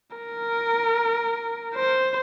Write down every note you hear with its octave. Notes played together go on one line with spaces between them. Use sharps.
A#4
C5